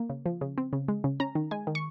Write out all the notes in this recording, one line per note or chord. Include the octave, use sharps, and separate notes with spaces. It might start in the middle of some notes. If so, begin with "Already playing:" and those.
Already playing: A#3
C#3
F3
C#3
C4
C#3
G#3
C#3
C#4 A#5
D#3
G#3 G#5
D#3
C#6